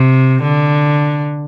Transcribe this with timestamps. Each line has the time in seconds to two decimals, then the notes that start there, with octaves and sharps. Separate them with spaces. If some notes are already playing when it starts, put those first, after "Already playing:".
Already playing: C3
0.43 D3